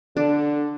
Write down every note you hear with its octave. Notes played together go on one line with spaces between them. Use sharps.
D3 D4